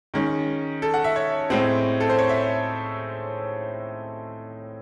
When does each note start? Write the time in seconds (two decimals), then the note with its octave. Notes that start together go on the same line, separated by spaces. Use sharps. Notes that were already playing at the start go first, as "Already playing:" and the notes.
0.14 D#3 G#3 C#4
0.82 A4
0.94 F#5
1.04 E5
1.16 C#5
1.50 A2 G#3 C4
2.00 A4
2.09 C5
2.18 C#5
2.29 E5